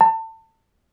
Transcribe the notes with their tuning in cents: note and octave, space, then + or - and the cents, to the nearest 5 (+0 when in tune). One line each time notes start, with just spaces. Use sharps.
A5 +30